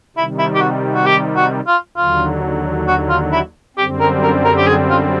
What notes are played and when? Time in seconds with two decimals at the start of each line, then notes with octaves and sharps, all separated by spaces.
0.16 C3 D#3 G3 E4
0.39 E4
0.55 G4
0.61 F#4
0.95 F#4
1.06 G4
1.36 F#4
1.67 F4
1.97 D#2 D3 F#3 F4
2.88 F#4
3.09 F4
3.32 E4
3.77 F#2 D3 G3 C4 G4
4.00 A#4
4.23 A#4
4.45 A#4
4.58 G4
4.67 G#4
4.90 F4